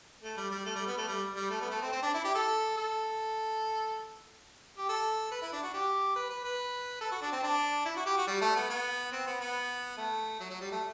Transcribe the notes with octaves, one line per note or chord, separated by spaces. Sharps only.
A3
G3
G3
A3
G3
B3
A3
G3
G3
A3
B3
A3
C4
C4
D4
E4
G4
A4
A4
G4
A4
B4
E4
D4
F#4
G4
B4
B4
B4
A4
F#4
D4
C4
D4
E4
F#4
G4
F#4
G3
A3
B3
B3
C4
B3
B3
A3
F#3
F#3
G3
A3